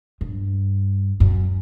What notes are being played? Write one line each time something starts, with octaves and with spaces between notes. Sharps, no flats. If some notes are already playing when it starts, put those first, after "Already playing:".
G2
F#2